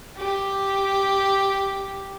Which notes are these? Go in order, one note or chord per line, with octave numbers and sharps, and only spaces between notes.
G4